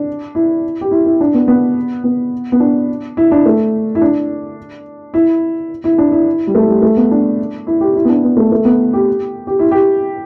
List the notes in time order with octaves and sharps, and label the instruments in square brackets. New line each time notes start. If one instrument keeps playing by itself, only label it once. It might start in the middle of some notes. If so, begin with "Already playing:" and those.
Already playing: [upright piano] D4
E4
G4
E4
E4
D4
B3
B3
B3
B3
D4
E4
D4
A3
E4
D4
E4
E4
D4
E4
G3
A3
G3
A3
B3
D4
E4
G4
E4
B3
D4
B3
A3
A3
B3
G4
G4
E4
G4